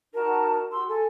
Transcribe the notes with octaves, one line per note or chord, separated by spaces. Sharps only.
D#4 F#4 A#4 A5
F#4 G4 C6 E6
A4 G#5